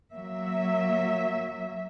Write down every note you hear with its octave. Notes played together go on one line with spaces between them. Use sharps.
F#3 A#3 E5